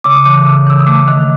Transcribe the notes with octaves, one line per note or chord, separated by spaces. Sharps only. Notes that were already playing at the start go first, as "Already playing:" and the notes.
C#3 D6
D#6
E3 D6
C#3
E3 E6
D#6
A3 D6
D#3